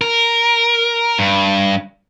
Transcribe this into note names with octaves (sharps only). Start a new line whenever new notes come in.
A#4
G2